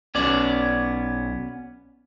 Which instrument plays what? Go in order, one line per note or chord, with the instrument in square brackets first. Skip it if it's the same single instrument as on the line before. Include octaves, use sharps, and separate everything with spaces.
[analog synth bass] B1 [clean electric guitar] B3 C#4 D5